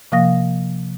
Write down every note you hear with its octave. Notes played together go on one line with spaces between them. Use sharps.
C3 F3 A#3 F5 D#6 A#6